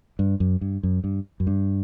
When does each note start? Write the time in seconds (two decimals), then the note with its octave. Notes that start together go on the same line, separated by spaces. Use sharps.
0.19 G2
0.40 F#2
0.61 G2
0.83 F#2
1.04 G2
1.40 F#2
1.47 G2